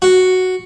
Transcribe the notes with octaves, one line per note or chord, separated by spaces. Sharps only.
F#4